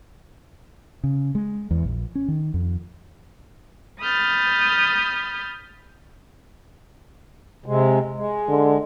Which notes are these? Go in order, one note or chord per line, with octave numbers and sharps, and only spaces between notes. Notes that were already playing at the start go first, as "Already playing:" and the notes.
C#3
G#3
E2
A#1
C#4
D#3
F2
B5 D#6 F6 G6 A6
C3 G#3
G#3
D3